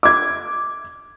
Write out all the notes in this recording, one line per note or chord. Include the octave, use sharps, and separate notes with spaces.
D6 G#6